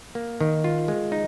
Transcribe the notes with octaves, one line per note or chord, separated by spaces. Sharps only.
A#3
D#3
F4
G#3
D#4